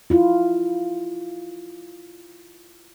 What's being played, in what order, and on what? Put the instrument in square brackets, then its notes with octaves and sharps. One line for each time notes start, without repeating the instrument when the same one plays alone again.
[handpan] E4 F4